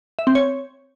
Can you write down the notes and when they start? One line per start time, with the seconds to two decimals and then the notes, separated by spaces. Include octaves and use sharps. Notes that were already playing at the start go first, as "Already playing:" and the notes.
0.19 E5
0.27 C4
0.35 C#5